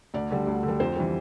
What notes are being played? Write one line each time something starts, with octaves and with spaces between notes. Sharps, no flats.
D2 D5
D3 G3
D2
D3
G3
F2 C5
E3 G3